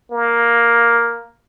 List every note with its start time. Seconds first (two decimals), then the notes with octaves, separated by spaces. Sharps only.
0.12 A#3